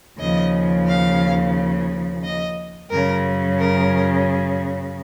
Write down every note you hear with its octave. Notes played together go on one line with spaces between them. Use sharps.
D#2 C#3 F3 D#5
F5
D#5
F#2 C#3 F#3 A#4
A#4